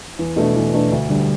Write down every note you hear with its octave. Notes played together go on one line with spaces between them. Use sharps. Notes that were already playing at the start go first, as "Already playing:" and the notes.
E2
B2 A3 D4
E2
B2 A3 D4
D2
D3 G3